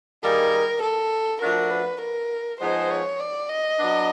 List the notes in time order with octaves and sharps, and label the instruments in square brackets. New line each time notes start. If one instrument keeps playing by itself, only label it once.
[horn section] D#3 G3 A#3 D#4 G#4 [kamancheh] A#4
[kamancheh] A4
[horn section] F3 A3 D4 F#4 [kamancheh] A#4
[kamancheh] B4
A#4
[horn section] F3 G#3 B3 D#4 G#4 [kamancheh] C5
[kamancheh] C#5
D5
D#5
[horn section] F#3 B3 D4